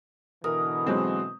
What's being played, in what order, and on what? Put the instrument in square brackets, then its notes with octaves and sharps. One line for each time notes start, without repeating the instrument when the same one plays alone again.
[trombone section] B2 D3 E3 [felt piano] A#4 [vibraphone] D#6
[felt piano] F#3 G#3 C4